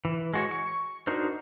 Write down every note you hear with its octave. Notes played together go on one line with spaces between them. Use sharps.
E3
G#3 F#4 C#5
C#6
D4 D#4 F#4 A#4 C5